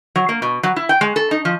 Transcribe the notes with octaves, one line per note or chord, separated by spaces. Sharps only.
F#3
A#3
B2
F#3
E4
G5
G#3
A4
D#4
F3